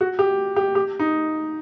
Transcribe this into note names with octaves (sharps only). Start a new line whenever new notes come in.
F#4
G4
G4
G4
D#4